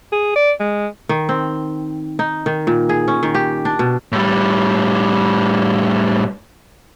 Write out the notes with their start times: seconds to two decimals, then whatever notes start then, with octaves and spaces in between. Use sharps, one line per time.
0.13 G#4
0.36 D5
0.60 G#3
1.09 D#3
1.29 C4
2.19 D#4
2.46 D#3
2.67 A#2
2.89 G#4
3.08 C#4
3.23 D#3
3.35 G4
3.65 D4
3.79 B2
4.12 A2 G3